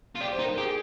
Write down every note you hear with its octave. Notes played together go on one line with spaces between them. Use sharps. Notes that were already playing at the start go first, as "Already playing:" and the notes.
F4
G4 D5
C5
D#4
A#4
G4 G#4